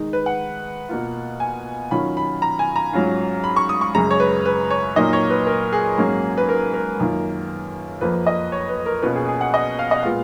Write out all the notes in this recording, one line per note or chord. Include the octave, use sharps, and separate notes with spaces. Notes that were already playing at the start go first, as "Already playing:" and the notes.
Already playing: D#3 G#3 D#4
B4
F#5
B2 A#3 F4
G#5
D#3 F#3 C#4 F4 B5
B5
A#5
G#5
A#5
G#2 F#3 C#4 F4
B5
C#6
D#6
C#6
F#2 C#3 G#3 A#5
C#5
B4
B4
C#5
A#2 F#3 A#3 D#4 D#5
C#5
B4
A#4
G#4
G#2 F#3 A#3 C#4
B4
A#4
A#4
F#2 D#3 A#3 F4
F2 F3 A#3 B4
D#5
C#5
B4
A#4
B2 A#3 C#4 F4 B4
G#4
G#4
F#5
D#5
F5
D#5
A#2 G#3 B3 F4 F5